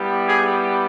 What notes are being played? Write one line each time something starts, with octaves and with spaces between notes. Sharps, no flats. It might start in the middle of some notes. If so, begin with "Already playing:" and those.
Already playing: G3 B3 E4 G4
G#4